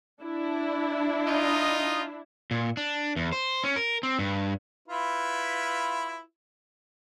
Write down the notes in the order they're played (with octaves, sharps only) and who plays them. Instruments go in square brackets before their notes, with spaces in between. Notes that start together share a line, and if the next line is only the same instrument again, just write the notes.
[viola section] D4 E4
[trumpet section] D#4 F4 D#5
[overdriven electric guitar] A#2
D4
E2
C5
C#4
A#4
C4
G2
[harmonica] E4 F4 B4